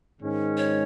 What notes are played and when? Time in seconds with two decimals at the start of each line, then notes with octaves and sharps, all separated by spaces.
0.21 G#2 D#3 G#3 C#4
0.57 C#5